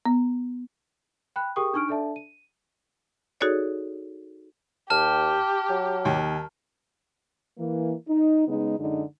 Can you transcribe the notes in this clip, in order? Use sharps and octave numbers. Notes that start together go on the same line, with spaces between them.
B3
G5 B5 F#6
G4 G#4 A#4 G5 C#6 D#6
D4 D#4 C#6 F6 D7
D4 A4 D5 E5 A5
D#7
D#4 F#4 G#4 A4 C#5 D5
D#2 G4 A5 F6
F#3
D#2
E3 A#3
D#4
C#3 G#3 B3 D#4
F#2 D3 G#3 D#4